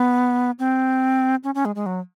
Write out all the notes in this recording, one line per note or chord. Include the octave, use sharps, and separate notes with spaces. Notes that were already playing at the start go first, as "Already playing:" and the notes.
Already playing: B3
C4
C#4
C#4
G#3
G#3
F#3